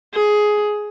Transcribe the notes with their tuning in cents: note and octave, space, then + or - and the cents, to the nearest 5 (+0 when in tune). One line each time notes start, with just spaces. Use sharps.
G#4 +10